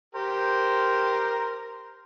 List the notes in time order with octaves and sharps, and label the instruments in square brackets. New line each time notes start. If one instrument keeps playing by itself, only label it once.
[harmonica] G4 A#4 [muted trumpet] C5